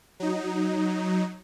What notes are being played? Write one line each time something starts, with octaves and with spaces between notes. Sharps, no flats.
F#3 D#4